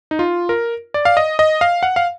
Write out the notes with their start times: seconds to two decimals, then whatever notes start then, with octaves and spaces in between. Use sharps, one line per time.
0.11 D#4
0.19 F4
0.49 A#4
0.94 D5
1.05 F5
1.17 D#5
1.39 D#5
1.61 F5
1.83 F#5
1.96 F5